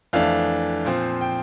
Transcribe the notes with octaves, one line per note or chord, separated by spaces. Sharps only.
F2 E3 A3 D4 F5
A#2 F3 C4
G5